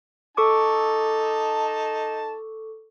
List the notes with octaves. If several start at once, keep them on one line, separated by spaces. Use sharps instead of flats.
D#4 A4 A5 C#6 D6